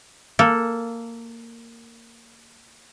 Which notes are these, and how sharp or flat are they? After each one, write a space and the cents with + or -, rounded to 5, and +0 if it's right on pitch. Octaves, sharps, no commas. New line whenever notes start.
A#3 -10 A4 +0